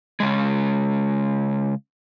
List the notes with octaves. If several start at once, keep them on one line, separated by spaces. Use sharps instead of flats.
C#3 G#3